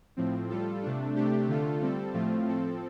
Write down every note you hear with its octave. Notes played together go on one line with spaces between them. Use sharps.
A2 F3 C4
G3 F4 A4
C3 A3 D4
C3 A3 D4 G4
D3 A3 F4 A4
G3 C4 A4
A2 F3 A3 C4 F4
F3 C4 A4